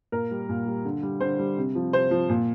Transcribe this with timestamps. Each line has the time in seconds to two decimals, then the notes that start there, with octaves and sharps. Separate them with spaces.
0.12 A#2 A#4
0.31 G3
0.49 A#2
0.67 G3
0.85 D3
1.03 G3
1.20 D3 C5
1.39 G3
1.57 C3
1.75 F3
1.93 C3 C5
2.11 F3
2.29 A#2